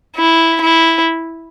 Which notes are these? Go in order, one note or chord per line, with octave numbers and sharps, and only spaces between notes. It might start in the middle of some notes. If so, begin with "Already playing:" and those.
E4
E4